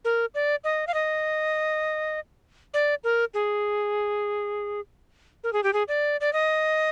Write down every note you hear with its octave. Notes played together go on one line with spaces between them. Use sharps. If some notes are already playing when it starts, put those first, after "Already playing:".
A#4
D5
D#5
F5
D#5
D5
A#4
G#4
A#4
G#4
G4
G#4
D5
D5
D#5